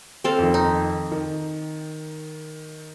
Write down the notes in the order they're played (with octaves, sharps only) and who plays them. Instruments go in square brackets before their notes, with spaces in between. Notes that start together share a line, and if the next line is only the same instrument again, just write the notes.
[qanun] C4 A4 F5
[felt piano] F2 D#3
[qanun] D#4
[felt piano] D#3